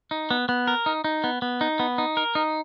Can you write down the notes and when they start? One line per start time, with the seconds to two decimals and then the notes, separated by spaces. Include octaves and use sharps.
0.11 D#4
0.31 B3
0.49 B3
0.68 A#4
0.86 D#4
1.04 D#4
1.24 B3
1.42 B3
1.61 D#4
1.80 B3
1.98 D#4
2.17 A#4
2.35 D#4